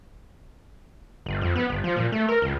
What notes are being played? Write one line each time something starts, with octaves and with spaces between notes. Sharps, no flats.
G1
F2
B3
G1
F3
A#2
A3
A#4
C#2